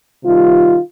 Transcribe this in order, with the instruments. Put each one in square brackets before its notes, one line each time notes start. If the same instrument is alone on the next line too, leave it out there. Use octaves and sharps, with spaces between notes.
[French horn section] C3 D#3 G3 F4